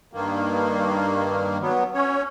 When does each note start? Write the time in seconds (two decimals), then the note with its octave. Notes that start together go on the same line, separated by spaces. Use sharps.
0.13 G2 D#3 A#3
1.61 F#3 B3
1.94 C#4 C#5